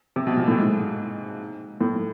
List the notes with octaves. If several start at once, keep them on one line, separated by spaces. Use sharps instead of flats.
C3
B2
A#2
A2
G#2
A2